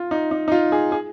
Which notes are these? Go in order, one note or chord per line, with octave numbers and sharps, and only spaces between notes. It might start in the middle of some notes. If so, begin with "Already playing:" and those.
Already playing: F4
D#4
D#4
D#4
F4
G#4
G#4